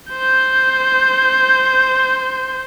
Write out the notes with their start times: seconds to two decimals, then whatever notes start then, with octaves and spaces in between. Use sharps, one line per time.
0.11 C5 G6